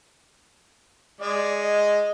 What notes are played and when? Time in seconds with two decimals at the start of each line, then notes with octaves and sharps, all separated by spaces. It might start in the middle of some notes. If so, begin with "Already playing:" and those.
1.21 G#3 D5
1.61 D#5